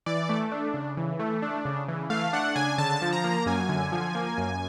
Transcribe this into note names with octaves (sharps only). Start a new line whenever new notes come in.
E3 D5
A3
D4
C#3
E3
A3
D4
C#3
E3
A3 F5
D4 F#5
C#3 G#5
D3 A5
F3
A#5
A#3
F#2 G#5
D3
F3
A#3
F#2